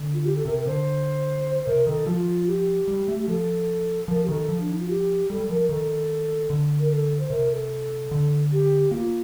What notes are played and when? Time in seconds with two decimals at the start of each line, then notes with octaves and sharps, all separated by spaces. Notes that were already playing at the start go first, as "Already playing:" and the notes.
Already playing: D3
0.14 F4
0.25 G4
0.35 A4
0.45 C3 A#4
0.58 A#4
0.66 D3 C5
1.54 C5
1.67 C3 A#4
1.87 D#3 A4
2.07 F3 F4
2.47 G4
2.88 G3
3.08 A3
3.18 G4
3.27 F3 A4
4.08 F3 A#4
4.24 G4
4.28 D#3 A4
4.49 F3
4.60 D4
4.70 D#4
4.79 F4
4.89 G4
5.30 G3 A4
5.40 G3
5.49 F3 A#4
5.69 D#3 A4
6.50 D3
6.79 A#4
6.91 A4
7.19 C5
7.30 C3 A#4
7.51 A4
8.11 D3
8.52 G4
8.91 A#3 F4